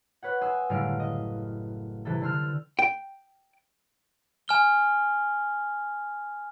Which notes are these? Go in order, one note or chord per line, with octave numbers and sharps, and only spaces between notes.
B4 C#5 F#5
G#5 C6 D#6 E6 G#6
F#1 A2 D3 G3 F5 D7
D#5
C3 E3 G3 A4
D3 G5 C6 E6 F6
G5
G#5 F6 G7